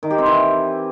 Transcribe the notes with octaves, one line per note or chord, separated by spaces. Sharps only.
D#3
G4
C4
E3